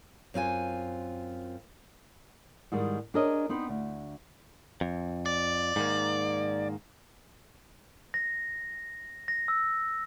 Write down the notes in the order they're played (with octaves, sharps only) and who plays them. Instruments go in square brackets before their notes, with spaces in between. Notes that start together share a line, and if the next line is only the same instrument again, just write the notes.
[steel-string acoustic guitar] F#2 C4 F4 G#5
[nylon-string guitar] G#2 D#3 G3 G#3
D4 G#4 A#4 C#5 D#5
B3 C4 D#4 B4
D2
[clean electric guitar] F2
[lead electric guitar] D5
[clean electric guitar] G#2 D#3 A#3
[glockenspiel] A#6
A#6
E6